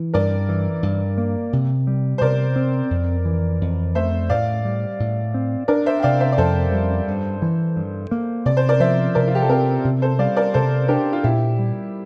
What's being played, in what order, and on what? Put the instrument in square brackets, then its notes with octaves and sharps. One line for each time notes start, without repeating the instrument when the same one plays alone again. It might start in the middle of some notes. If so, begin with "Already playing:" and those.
Already playing: [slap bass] E3
[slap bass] G2 [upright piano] A#4 D5
[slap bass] E3
G2
A#3
C3
G3
[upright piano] C5
[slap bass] C3 [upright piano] A#4 D5
[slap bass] C4
F2
E3
F2
[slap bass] A3 [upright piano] C5 E5
[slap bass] A2 [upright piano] D5 F5
[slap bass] G3
A2
C4
[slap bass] D4 [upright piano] A#4 D5
[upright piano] C5 E5
G5
[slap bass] C3 [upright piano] D5 F5
[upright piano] C5 E5
D5
[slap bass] F2 [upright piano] A4 C5
[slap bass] G3
G2
E3
G2
A#3
[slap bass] C3 [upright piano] D5
[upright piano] C5
A#4 D5
[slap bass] F3 [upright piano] C5 E5
[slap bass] C3 [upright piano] A#4 D5
[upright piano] F4
G4
A4
[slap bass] C4 [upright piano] G4 A#4
[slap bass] C3
[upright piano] A4 C5
[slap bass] G3 [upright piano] D5 F5
[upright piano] A#4 D5
[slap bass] C3 [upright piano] A4 C5
[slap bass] D4 [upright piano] G4 A#4
[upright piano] F4
[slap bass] A#2 [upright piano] E4 G4
[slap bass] G3